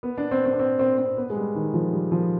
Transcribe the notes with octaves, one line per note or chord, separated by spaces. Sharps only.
B3
D4
C4
C4
D4
C4
C4
C4
B3
G#3
G3
D#3
F3
G3
F3